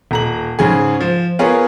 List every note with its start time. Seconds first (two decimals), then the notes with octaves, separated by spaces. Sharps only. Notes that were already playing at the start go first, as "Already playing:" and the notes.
0.11 D#1 A#5 F#7
0.59 G#2 C#3 G#4
1.00 F3
1.39 B3 F4 G#4 A#4 C#5